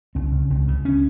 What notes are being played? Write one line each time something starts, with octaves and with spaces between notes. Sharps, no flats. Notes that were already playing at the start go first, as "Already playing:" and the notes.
C#2 C4
C#3
C#2
C#3
C#4